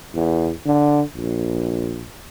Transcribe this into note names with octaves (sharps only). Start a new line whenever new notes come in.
E2
D3
A#1